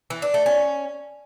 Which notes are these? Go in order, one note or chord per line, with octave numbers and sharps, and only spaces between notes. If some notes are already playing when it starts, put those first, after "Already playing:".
E3
D4
A3
C#4